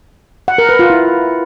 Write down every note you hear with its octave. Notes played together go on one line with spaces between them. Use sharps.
F#5
A#4
B4
F4
E4